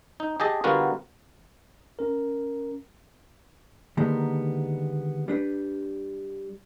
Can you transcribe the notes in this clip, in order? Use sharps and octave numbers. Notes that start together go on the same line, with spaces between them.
D#4
G4 G#4 D#5 A5
D3 G3 B3 F4 F#4 A#4
C#4 A#4
D3 D#3 G3 G#3 A#3 B3
G3 D4 B4